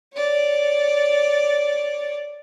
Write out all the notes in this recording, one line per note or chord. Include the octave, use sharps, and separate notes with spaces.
C#5 D5